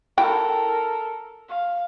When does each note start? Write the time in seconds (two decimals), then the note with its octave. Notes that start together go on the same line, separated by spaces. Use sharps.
0.18 E4 A4 A#4 G5
1.49 F5